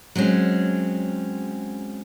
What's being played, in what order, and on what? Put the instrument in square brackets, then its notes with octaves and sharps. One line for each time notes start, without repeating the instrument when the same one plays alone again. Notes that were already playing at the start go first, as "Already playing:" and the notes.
[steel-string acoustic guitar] F#3 G#3 C4 C#4 G#4